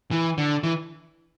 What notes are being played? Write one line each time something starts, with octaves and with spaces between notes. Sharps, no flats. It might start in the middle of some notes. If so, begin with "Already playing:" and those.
E3
D3
E3